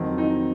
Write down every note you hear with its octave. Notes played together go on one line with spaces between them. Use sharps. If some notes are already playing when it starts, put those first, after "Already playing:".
Already playing: F2 D#3 F#3 C4
D#4